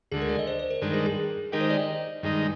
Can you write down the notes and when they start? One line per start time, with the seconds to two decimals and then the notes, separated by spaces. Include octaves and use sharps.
0.12 D2 D3 G#3 G#4
0.21 A#4
0.29 D5
0.39 D#5
0.47 C5
0.59 C5
0.70 A#4
0.82 G2 D#3 G#3 D4 A#4
0.94 G#4
1.06 G#4
1.52 D#3 G#3 D#4 G4 A#4
1.61 C5
1.70 D5
1.79 D#5
2.23 G2 D#3 G#3 D#4